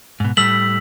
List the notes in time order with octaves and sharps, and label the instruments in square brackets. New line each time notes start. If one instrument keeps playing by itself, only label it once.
[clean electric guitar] G#2 B2
[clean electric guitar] A2 G3 A3 [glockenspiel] E6 B6 F#7